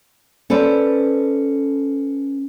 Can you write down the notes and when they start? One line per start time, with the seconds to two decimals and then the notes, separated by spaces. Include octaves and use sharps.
0.50 C#4 A4 B4 C5 D5